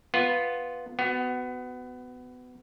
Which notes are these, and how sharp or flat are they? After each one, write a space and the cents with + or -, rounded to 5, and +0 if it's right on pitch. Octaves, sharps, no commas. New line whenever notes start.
B3 +0 F4 +0
B3 +20 F#4 +0